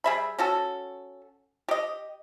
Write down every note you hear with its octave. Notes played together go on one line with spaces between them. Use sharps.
G3 G#4 E5 B5
C#4 F#4 A4
G4 D#5